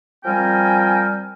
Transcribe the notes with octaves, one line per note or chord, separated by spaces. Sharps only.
F3 G3 C4 A#4 G5 G#5